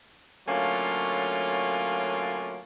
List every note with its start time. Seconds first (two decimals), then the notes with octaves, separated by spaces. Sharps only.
0.47 D3 F#3 A3 A#3 C#4 F4